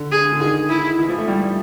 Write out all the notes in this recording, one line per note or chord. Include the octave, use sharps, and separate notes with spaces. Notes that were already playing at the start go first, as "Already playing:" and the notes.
Already playing: D3
G#4
D3
D#3 G#4
E4
E3
F3
A3
G3